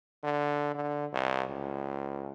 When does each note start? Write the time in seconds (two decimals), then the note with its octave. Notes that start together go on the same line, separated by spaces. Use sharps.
0.24 D3
0.75 D3
1.13 C2
1.50 C#2